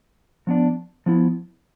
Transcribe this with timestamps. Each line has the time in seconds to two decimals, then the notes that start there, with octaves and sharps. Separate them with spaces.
0.47 F3 B3 D4
1.06 F3 B3 E4